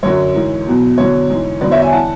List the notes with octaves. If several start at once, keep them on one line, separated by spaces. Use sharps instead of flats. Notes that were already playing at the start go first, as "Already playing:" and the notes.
F#2 D3 F#3 C#5
G#2 E3
E2 B2 F#3
E2 D3 F#3 C#5
G#2 E3
E2 D3 F#3 B4 D5
C#5 E5
E5 G#5
E3 F#5 A5